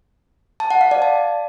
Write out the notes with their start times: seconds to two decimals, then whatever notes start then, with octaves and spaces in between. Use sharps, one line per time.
0.60 A5
0.71 F#5
0.81 F5
0.91 D5
1.02 A5